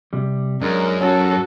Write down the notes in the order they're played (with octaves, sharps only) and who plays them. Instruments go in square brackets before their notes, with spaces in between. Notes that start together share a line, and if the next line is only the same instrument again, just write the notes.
[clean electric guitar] C3 G3
[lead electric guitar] F#2 [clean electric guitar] G#3 D4 [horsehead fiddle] A#4
[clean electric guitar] C#4 [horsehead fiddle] F#4 A4